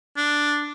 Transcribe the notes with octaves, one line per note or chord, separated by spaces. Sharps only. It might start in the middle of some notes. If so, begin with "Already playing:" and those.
D4